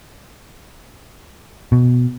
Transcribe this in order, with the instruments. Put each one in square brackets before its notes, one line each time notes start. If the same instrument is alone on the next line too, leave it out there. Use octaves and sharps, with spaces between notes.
[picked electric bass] B2